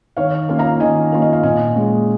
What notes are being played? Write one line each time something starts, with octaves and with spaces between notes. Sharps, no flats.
D#3 C#5 F5
A#3 C#4 F4
F5 A#5
D#3 D#5 G#5
A#3 C#4 F4
D#5
F5
A#2 D#5 G#5
G#3 C#4